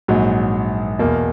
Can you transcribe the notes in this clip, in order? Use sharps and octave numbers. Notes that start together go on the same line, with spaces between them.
A#1 G#2 F#3
E2 B2 A#3